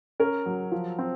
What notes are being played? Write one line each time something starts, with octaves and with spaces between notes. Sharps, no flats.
C#4 A#4
F#3
F3
C4